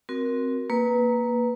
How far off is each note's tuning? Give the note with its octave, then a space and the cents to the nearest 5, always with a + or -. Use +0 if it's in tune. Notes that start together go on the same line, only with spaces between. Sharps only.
C4 +0 F#4 +0 A#4 +15
A#3 +0 B4 -5